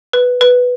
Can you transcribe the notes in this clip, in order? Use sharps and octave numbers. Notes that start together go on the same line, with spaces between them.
B4
B4